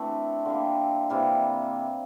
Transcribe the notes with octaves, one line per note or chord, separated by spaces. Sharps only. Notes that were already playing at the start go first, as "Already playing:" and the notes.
Already playing: E3 A3 C4 D4 E4 A4
D3 G3 A#3
C3 E3 G3 A#3